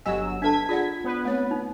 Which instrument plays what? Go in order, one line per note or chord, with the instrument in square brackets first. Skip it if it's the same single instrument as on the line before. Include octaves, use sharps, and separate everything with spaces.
[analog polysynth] G1 F#3 E6 [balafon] G4 D#5 G#5
[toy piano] D4 B4 A5 [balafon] A4 E5 [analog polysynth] G#6 B6
[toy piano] F4 A#5 [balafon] G#4 D5 F#5
[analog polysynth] B3 B4
[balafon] A3 C4 C#5
[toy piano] D#4